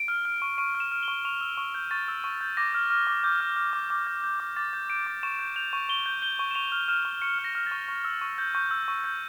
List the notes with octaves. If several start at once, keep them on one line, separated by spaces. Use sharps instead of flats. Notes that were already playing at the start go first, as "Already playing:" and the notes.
Already playing: D7
F6
F6
C#6
C#6 D7
F6
E7
F6
G7
C#6
C#6 F7
E6
C#6
G6
C#6 A6
E6
C#6
G6
D6 A#6
F6
F6
D6
D6 G6
F6
F6
D6
D6
G6
G6
D6
D6 A6
G6
G6 D7
D6
C#6 E7
G6
G6 F7
C#6
C#6 G7
G6
G6 G7
C#6
E7
C#6 F7
F6
F6 E7
C#6
C#6 C#7
F6
A#6
F6
C#6 A6
C#6
E6
C#6
G6
C#6 G6
E6
C#6
G6